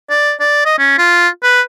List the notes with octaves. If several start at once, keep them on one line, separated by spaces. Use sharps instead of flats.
D5
D5
D#5
C#4
F4
B4